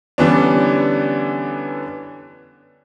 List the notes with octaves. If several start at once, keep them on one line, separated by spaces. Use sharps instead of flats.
D3 E3 G3 B3 C#4 D4